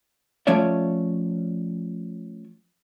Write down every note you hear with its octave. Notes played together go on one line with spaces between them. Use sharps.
F3 A3 C#4 C#5 D5 E5